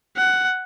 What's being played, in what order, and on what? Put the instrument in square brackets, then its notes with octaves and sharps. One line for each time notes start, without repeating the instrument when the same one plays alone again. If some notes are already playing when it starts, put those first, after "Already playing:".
[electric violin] F#5